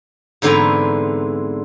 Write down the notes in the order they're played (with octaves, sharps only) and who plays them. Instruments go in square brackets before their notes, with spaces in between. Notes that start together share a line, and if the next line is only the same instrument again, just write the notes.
[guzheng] G#2 D3 E3 B3 C4 A#5